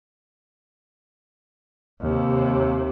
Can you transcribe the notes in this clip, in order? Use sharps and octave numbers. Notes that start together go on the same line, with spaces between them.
D#2 C3